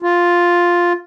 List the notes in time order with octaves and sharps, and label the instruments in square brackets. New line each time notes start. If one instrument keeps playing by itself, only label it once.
[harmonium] F4